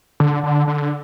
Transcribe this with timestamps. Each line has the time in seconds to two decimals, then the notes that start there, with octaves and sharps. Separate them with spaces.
0.20 D3
0.44 D3
0.68 D3